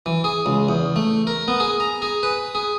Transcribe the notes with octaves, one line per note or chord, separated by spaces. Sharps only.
E3
G#4
C#2
E2
A3
A#4
B3
G#4
A#5
G#4
B4
G#4